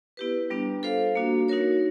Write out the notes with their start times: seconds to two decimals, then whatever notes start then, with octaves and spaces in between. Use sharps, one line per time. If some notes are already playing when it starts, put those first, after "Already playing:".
0.17 B3 E4 G4 B4
0.50 G3 B3 D4
0.83 F4 A4 C5 F5
1.15 A#3 D4 F#4
1.48 D#4 F#4 A#4 C#5